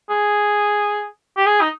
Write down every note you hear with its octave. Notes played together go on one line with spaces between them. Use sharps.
G#4
G4
G#4
D#4